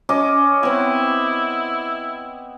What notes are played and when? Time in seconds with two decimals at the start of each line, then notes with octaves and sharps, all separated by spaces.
0.09 C#4 D#5 D6
0.63 B3 C4 E4